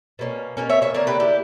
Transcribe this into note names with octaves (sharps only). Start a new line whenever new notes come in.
B2 A#3 C#4
B2 A#3 C#4
C#5 E5
C#5 E5
D3 A#3 D4 A#4 C#5
G4 B4
E4 G4